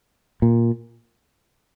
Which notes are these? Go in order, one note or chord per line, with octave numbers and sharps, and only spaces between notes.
A#2